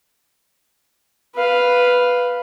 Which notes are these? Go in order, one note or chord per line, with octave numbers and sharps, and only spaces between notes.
B4 F5